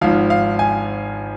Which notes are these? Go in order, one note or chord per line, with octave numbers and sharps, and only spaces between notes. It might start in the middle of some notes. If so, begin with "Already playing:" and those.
G#1 G#2 F3 F5
F5
G#5